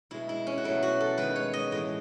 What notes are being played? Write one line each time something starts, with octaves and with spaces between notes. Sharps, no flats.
B2 G#3 E4
E4
C#4
F#4
B2 F#3 A3 E4
F#4
A4
D#3 G#3 B4
C#5
D#5
A2 E3 G#3 D#5